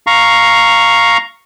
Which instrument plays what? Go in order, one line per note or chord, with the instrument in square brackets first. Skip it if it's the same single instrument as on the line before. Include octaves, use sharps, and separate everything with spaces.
[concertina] F5 A#5 C#6